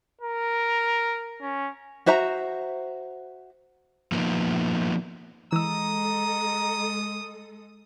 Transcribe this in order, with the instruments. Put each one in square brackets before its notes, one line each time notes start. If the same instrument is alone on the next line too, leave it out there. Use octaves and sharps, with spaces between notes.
[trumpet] A#4
C#4
[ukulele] F#4 C5 E5 A#5
[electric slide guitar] F3 A#3 B3 D#4
[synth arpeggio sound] E3 E6 [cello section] G#3 A4 [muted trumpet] A#5 [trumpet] D#6